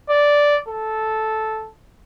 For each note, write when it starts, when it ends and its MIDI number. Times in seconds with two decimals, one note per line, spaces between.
0.10 0.58 74
0.69 1.69 69